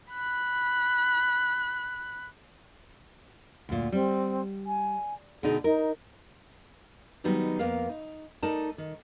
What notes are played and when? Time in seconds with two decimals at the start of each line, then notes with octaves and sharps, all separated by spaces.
0.12 B5 F#6
3.69 D2 A#2
3.92 G3 C4
4.66 G#5
5.43 B2 D3 D#4 G#4
5.64 D#4 A#4
7.24 D#3 F#3 G3 B3 D#4
7.59 F2 A#3 B3 A#4 F5
7.89 D#4
8.43 A3 D#4 A#4 D5 A5
8.78 D#3